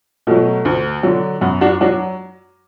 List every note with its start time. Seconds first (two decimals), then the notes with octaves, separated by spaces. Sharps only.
0.27 B2 F#3 A3
0.65 D2
1.03 D3 F#3
1.41 F#2 B3
1.61 D4 F#4
1.81 F#3 D4 F#4